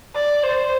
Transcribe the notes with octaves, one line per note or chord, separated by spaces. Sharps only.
D5
C5